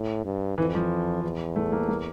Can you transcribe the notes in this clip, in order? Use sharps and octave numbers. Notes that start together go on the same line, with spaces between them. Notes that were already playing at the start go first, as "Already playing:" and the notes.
Already playing: A2
G2
F2 E3
F3
E2
A3
A#3
A#3